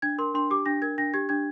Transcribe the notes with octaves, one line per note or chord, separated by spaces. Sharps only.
D4 G#6
A#4 C6
D4 C6
G4 D6
D4 A#6
A#4 G#6
D4 A#6
G4 G#6
D4 G#6